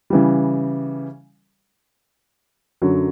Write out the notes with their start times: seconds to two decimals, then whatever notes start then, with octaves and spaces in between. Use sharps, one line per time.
0.10 C#3 E3 G3
2.82 F#2 D3 F#3